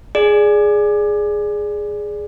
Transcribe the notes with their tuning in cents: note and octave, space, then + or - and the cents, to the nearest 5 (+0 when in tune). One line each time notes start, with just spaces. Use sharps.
G#4 +0 D5 +0